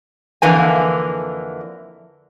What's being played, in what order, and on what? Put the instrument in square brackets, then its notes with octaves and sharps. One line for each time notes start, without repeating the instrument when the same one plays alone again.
[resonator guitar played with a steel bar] F2 D3 E3 A#3 G#5